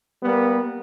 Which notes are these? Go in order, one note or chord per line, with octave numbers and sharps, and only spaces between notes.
G3 A#3 B3